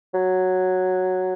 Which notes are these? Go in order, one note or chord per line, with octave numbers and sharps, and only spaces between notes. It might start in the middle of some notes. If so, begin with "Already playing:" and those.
F#3